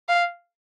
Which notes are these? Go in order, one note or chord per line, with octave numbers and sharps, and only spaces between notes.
F5